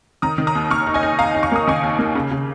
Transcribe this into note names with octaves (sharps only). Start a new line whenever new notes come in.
D#3 A#5 D#6
D#3
A#5 D#6
D#2
D#2 C#6 F6
D#4
D#5 G#5
D#4
D#2 F5 A#5
D#4
C#6
A#3 D#6
D#3 G#5 C#6
D#2
A#3
C#3
C#3